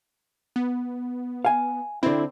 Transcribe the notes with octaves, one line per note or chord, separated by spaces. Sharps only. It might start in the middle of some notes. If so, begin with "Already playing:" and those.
B3
F5 G#5
D3 C4 E4